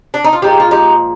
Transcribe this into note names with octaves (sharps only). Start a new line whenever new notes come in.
D4
D#4
F4
A#2 F3 G#3 D#4 G4
F4
D#4 G4